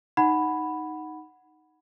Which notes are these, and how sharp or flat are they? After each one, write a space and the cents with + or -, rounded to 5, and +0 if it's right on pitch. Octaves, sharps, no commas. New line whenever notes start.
D#4 +0 F#5 +0 B5 +0